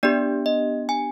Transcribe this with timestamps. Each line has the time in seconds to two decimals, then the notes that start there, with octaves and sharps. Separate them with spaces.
0.03 B3 D4 G4 D5
0.46 D#5
0.89 G#5